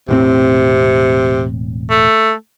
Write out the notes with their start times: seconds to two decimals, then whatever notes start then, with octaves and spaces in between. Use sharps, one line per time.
0.09 E1 A2 C3 C4
1.90 A3